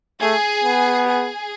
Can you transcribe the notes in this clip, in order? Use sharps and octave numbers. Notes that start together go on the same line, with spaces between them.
A3 G#4
B3
G#4